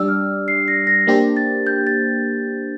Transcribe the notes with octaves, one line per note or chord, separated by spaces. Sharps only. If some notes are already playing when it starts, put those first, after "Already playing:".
Already playing: G3 D4 G4 D5 E6
F6
C7
A#6
A#6
A#3 D4 G4 C5
A6
G6
A6